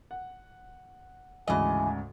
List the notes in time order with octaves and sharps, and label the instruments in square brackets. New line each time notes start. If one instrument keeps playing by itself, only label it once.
[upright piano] F#5
[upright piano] D2 G#2 C#3 [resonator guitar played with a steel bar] E3 D#5 [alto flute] G#5